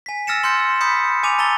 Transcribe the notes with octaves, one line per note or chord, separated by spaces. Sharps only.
G#5 B6
E6 F6 A6 A#6 C#7 E7
C6 F6 G6 C#7
B5 D#6 G6 B6 C#7
G#5 D6 D#7 F7
A5 A#5 E6 A6 G7